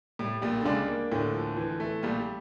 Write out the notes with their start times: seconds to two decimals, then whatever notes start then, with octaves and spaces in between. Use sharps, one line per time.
0.19 A2 G3
0.42 A#1 A#2 G3
0.61 D3
0.65 C#2 C#3 D4
0.88 A#3
1.11 D2 A2 D3
1.34 F3
1.57 E3
1.80 A3
2.03 A#1 A#2 G3